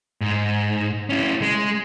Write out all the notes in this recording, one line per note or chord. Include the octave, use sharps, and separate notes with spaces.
G#2
C#4 E4
G#3